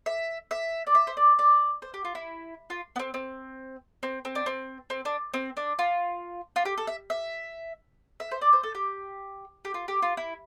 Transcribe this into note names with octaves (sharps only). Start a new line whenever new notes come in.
E5
E5
D5
E5
C5
D5
D5
C5
G4
F4
E4
F4
B3
C4
C4
C4
C4
D4
C4
C4
D4
C4
D4
F4
F4
G4
A4
E5
E5
E5
C5
D5
C5
A4
G4
G4
F4
G4
F4
E4